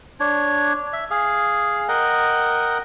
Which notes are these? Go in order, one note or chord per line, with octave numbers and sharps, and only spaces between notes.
D4 C#5
E5
G#4 F5
A#4 D#5 F#5 G5